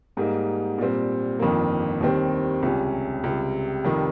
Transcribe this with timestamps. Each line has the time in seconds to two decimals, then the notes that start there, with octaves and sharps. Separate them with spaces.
0.17 G#2 G3 A#3 D#4
0.78 A#2 G3 C4
1.39 G1 F2 D#3 A#3
2.01 D#2 D#3 G3 C4
2.62 C#2 C3 G3 C#4
3.24 C#2 C3 G3
3.85 F1 F2 C3 D#3